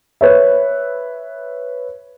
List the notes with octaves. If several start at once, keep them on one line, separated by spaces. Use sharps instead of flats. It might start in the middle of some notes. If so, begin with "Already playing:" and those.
B4 C#5 E5